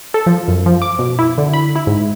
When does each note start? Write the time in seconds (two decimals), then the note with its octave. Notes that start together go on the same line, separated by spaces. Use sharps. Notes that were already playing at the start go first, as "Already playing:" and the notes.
0.14 A4
0.26 F3
0.48 F#2
0.66 F3
0.82 D6
0.99 B2
1.19 E4
1.38 D3
1.53 B5
1.76 E4
1.87 G#2